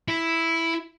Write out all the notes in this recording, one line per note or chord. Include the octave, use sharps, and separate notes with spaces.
E4